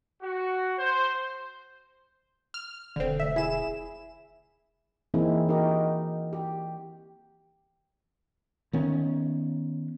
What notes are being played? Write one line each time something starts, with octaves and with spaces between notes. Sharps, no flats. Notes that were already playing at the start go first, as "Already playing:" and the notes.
F#4
C5
F6
E1 D3 C4
D2 E5
E4 G#4 E7
E3 A#3 C4 D#4 E4 G#4
D#4 F#4 G4 A#4 D#5
G4
D#3 B3 C#4